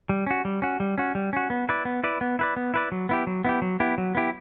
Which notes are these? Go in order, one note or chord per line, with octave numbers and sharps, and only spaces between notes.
G3
C#4 F#4
G3
C#4 F#4
G3
C#4 F#4
G3
C#4 F#4
B3
E4 B4 D5
B3
E4 B4 D5
B3
E4 B4 D5
B3
E4 B4 D5
F#3
B3 E4 G4
F#3
B3 E4 G4
F#3
B3 E4 G4
F#3
B3 E4 G4